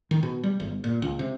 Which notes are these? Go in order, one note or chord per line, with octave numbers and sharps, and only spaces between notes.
D#3
B2
G3
G1
A#2
C#2
C3